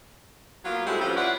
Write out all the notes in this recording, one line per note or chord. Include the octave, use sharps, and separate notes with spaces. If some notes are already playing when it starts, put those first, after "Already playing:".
F#3 A#3 B3 F4
G3 G#3 C4 E4 F#4 A4
F3 G3 C#4 G4 B4
E4 F4 B4 C#5 D5 F#5